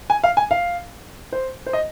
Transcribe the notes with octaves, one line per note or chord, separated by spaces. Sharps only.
G#5
F5
G#5
F5
C5
C5
D#5